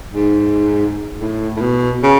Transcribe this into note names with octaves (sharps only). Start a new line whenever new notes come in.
G#2
A2
A2
B2
C#3